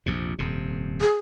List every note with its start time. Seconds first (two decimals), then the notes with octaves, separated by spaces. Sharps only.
0.06 A#1 F2 C3
0.39 D#1 F2 C3
1.01 G#4